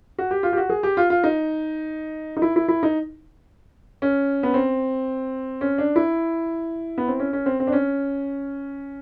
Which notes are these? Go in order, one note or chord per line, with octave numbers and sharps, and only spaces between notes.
F#4
G4
F4
G4
F#4
G#4
G4
F4
F4
D#4
D#4
E4
E4
E4
D#4
C#4
B3
C4
C#4
D4
E4
B3
C4
C#4
C#4
C4
C4
D4
C#4